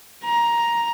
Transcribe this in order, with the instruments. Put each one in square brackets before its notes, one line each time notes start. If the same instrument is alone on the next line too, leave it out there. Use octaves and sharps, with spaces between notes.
[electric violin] A#5